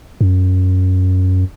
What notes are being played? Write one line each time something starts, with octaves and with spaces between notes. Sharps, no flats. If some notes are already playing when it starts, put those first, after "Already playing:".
F#2